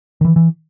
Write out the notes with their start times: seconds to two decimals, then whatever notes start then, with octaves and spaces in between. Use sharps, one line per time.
0.21 D#3
0.25 E3
0.36 E3